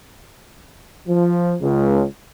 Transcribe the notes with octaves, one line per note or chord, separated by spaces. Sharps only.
F3
C#2